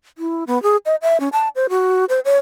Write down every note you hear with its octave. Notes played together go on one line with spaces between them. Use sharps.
E4
B3
G#4
D#5
E5
C#4
A5
C5
F#4
C5
C#5